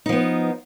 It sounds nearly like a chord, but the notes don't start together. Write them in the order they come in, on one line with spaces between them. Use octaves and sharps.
D#4 F3 B3